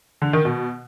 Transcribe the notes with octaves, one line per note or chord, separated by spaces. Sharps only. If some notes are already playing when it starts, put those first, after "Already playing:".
D3
D#3
B2